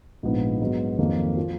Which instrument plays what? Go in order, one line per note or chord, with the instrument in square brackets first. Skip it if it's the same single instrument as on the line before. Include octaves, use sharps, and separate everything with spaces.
[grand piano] A#1 G#2 F3 B3 D#4
G#2 F#3 B3
F2 D#3 F#3 A#3
F3